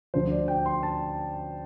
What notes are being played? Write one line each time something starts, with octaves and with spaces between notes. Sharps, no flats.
D2 D3 F3 C5
D5
G5
C6
A5